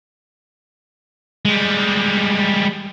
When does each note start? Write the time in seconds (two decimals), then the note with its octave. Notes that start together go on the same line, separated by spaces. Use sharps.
1.45 G3 G#3